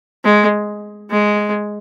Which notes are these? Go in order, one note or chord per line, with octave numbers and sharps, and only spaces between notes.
G#3
G#3